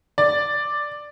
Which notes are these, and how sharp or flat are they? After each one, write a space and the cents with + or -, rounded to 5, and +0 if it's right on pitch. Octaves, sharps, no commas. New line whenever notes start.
D5 +5